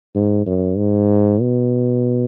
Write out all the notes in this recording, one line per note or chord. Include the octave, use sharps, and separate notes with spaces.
G#2
F#2
G#2
B2